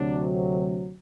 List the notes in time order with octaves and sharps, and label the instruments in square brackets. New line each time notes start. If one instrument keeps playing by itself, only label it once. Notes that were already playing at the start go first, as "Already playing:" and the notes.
Already playing: [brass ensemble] D2 C3 F#3 D4